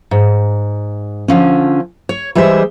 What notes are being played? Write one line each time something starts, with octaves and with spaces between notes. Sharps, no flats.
G#2
D3 F3 C#4
C#5
E3 G3 G#3 G#4 C5 E5